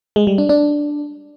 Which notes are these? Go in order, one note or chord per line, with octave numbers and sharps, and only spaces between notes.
G#3
G3
D4
D4